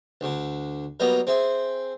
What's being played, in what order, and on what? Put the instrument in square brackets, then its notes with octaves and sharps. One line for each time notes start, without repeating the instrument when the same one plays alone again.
[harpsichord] D2 D3
F#3 G3 A#3 B3 D#5
C4 G#4 E5